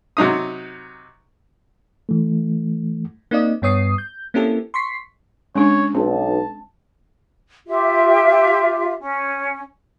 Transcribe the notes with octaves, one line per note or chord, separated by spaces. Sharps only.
C3 F#3 D#4 D#6
E3 A3
A#3 C4 D#4 D5 D#5
G2 B3 C#5 D#6 C7
G6
A#3 C4 C#4 E4 G4 A4
C6 C#6 B6 C7
G#3 C#4 D4 C#5
B1 C4 A5
F4 G4 E5
C#4